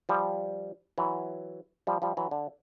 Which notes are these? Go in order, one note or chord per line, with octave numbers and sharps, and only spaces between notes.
F3 G3
E3 F#3
F3 G3
F3 G3
E3 F#3
D3